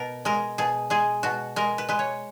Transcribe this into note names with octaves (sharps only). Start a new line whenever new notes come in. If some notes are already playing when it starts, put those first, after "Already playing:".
Already playing: B2 A#4
G#3 A#4
B2 G#4
G#3 G#4
B2 F#4
G#3 A#4
B4
G#3 B4
C#5